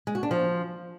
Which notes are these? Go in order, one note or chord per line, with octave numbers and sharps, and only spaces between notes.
G#3
F#4
D4
F3